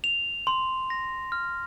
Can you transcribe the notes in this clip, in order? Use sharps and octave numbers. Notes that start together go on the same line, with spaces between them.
F7
C6
A#6
F6